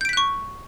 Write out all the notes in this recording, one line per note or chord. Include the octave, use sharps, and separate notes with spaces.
C#6 F#6 G6 B6 D7